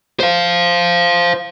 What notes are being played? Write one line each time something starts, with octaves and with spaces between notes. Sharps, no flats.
C5 F5